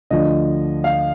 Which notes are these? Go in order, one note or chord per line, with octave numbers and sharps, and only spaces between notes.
D2 D3 F3 D#5
F5